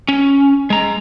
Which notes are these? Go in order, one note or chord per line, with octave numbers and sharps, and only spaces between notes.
C#4
G#3 A#5